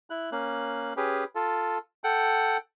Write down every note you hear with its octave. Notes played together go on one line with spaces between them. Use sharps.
E4 F#6
A#3 C#4 F#6
C#4 G4 G#4 B4
F4 A4
A4 F#5 G5